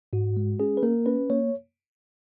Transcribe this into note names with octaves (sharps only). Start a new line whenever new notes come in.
G#2 F#4
G#3
C#4 G#4
B4
A#3 A#4
C#4 B4
A#3 C#5